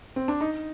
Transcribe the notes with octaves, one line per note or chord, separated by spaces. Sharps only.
C4
D4
D#4